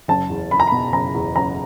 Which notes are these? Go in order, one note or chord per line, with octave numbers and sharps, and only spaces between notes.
F#1 A5
E2
F#1 B5
A#5
B5
B2
F#1 A#5
E2
F#1 A#5